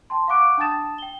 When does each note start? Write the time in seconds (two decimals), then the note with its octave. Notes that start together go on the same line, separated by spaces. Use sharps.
0.10 G5 A5 C6
0.28 F5 F#5 C#6 D6 F#6 D7
0.58 D4 G5 A5 D#6 A6 E7
0.98 G5 G7